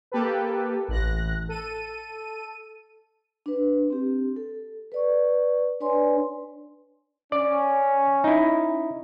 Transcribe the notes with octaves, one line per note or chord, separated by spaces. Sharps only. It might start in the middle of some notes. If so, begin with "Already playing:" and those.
A#3 G4 A4 B4
A1 F#6 A#6
A4 D#7
D4 B4
C4 G4
A4
B4 D5 C#6
D4 B4 C#5 D5 G#5 C6
C#4 D5
D#4 E4